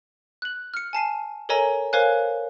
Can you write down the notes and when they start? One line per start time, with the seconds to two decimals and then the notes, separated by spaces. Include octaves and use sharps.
0.42 F#6 F#7
0.74 F6 C#7
0.93 G#5 A5 C7 D#7
1.49 A4 A#4 C#5 D#5 G#5 A#5
1.93 A#4 C5 C#5 F5 G#5 F#6